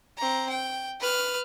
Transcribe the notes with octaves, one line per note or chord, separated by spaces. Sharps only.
C4 A#5
G5
B4 F6